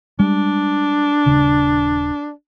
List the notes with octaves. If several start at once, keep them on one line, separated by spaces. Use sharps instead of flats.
G3 G#3 D4
D#1 C#3